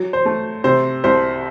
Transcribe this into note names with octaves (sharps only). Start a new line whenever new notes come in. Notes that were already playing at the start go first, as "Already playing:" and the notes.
Already playing: F#3
C5
A3
C3 C5
C2 C5